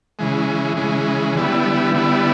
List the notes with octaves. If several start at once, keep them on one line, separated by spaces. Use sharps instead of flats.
C#3 E3 G#3
C#3 E3 G#3
D3 G3 B3 E4
D3 G3 B3 E4